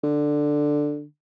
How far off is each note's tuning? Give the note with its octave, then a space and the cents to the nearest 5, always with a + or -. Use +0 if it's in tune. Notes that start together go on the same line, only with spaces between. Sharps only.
D3 +5